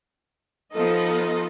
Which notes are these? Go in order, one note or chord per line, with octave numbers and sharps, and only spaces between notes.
F3 B3 D#4 F4 A4 D#5